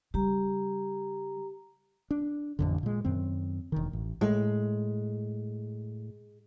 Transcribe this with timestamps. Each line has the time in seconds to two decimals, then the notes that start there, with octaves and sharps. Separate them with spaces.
0.14 C#3 G3 G4 A#5
2.11 D4
2.59 A1 F2 D3
2.83 A#2 G#3
3.05 F#2 D#3 C4
3.72 E1 D#3
3.93 A1
4.21 A2 G#3